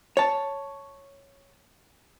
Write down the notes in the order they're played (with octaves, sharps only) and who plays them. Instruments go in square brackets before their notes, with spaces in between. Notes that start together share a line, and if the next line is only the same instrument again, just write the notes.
[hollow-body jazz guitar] C#5 A5